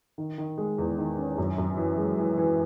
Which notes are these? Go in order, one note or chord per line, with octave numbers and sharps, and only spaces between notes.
D#3
D#3
G#3
E2
D#3
C#4
F#2
F#2
E3
G#3
E3
E3